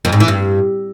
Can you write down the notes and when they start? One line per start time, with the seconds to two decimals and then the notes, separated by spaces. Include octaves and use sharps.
0.05 F2
0.12 G#2
0.20 E3
0.28 G2